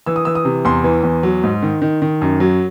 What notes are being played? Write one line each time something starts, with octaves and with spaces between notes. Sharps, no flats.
E3 E6
D#6
E3 E6
D#6
C3
E2 C6
E3
E2
F#3
G#2
D#3
D#3
D#3
F#2
F#3